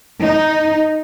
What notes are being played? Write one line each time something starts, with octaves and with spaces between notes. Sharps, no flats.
D#4